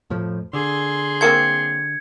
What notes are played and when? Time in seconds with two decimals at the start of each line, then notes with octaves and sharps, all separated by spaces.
0.10 F2 A2 F3
0.53 D3 G#4 C6
1.21 F#3 A#3 C4 G#6 C#7